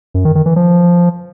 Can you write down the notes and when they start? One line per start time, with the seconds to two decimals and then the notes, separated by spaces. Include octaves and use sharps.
0.14 F#2
0.25 D#3
0.35 D#3
0.46 E3
0.56 F3